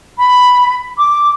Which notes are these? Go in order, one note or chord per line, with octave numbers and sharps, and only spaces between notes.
B5
D6